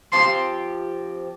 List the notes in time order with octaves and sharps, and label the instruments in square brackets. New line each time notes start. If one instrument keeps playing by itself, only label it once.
[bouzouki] F3 C4 G4 [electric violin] C6